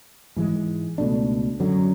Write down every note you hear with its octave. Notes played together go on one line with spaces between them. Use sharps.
G#2 E3 G#3
C#2 B2 A3 D4
F#2 D3 F#3